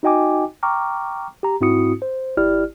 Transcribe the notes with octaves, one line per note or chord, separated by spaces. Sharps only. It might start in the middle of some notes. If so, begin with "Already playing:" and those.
D#4 F#4 D#5 G5 G#5 D6
G5 A#5 C#6 D6 F6
G4 A#5
G#2 C4 E4 F#4 D#6 C#7
C5
G#1 E4 G4 D5 F6